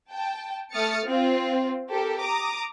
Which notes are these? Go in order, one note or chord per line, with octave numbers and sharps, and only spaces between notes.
G5 A5
A3 D#6 F6 A6 C#7
C4 F4
G4 A4 A#4
A#5 D6 D#6